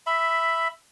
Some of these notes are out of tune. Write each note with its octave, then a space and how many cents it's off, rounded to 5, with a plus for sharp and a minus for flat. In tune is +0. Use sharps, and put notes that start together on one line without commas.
E5 +0 B5 +10